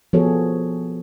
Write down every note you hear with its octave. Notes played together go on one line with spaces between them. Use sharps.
F3 B3 F#4 G#4 A4 C#5